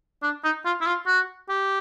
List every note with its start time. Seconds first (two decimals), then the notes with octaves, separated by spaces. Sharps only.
0.23 D4
0.44 D#4
0.65 F4
0.81 E4
0.87 F4
1.07 F#4
1.49 G4